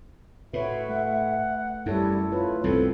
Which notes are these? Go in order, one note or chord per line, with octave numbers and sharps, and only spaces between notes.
A2 F#4 B4 C#5 E5
A3 F#5
F#2 G3 E4 A4 C#5
A3 F4 B4 C#5
C2 F#2 B2 C4 A4